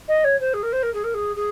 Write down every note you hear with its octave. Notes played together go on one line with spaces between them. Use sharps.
D#5
C#5
C5
G#4
A#4
C5
A#4
G#4
A#4
G#4
G#4